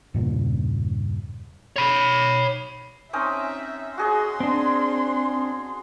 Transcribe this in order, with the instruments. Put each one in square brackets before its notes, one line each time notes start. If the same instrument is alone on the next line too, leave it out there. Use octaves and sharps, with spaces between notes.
[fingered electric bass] E2 G2 A#2 C#3
[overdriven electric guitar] C#5 B5
[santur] C4 C#4 D#4 [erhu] E5
[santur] F#4 G#4 D#5 [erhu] C6
[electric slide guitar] C4 D4